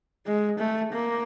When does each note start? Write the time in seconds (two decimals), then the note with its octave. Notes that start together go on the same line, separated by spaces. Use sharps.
0.26 G#3
0.59 A3
0.93 A#3